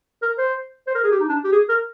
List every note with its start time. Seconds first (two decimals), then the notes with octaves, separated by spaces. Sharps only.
0.22 A#4
0.38 C5
0.87 C5
0.95 A#4
1.04 G#4
1.12 G4
1.20 D#4
1.28 D4
1.44 G4
1.52 G#4
1.69 A#4